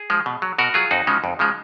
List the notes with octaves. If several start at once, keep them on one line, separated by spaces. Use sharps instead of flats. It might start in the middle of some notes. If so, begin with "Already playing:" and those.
Already playing: G#4
F3 G#3
B2
F#3
B2 F#4 A#4
F#3 F4 G#4
F2 D#4 F#4
C#3 F3 G#3
F2
C#3 F3 G#3